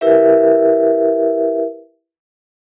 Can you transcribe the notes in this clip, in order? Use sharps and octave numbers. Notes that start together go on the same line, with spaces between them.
E4 G4 A#4 B4 E5